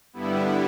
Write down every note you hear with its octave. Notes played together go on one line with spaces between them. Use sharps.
G2 D3 G3 B3 E4